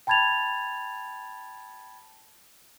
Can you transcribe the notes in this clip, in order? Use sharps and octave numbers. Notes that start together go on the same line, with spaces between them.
G5 A5 B5 G#6 A6 F7